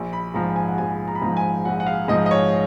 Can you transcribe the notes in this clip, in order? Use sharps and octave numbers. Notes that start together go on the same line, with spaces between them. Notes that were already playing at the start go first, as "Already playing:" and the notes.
Already playing: A#1
B5
G#2 F3 A#5
G#5
F#5
A#1 G#5
A#5
B5
G#2 F3 A#5
G#5
A#1 F#5
F#5
F5
G#2 F3 D#5
D#5
C#5